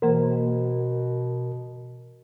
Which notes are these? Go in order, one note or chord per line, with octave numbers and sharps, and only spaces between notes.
B2 E3 A#3 A#4 C5